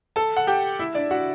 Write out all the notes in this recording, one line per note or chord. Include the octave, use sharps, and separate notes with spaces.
A4 A5
F#5
G4 G5
E4 E5
D4 D5
F#4 F#5